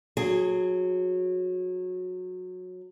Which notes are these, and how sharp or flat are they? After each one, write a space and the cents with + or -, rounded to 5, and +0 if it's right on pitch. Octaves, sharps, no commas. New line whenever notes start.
F#3 -20 G#4 +0